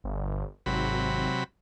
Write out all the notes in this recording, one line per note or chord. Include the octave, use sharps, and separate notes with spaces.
G1
G#1 C3 F#3 B5